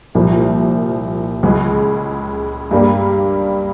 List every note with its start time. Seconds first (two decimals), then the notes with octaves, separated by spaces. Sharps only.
0.15 C2 A#2 F3 A#3
1.43 C#2 C#3 G#3
2.71 G2 G3 A#3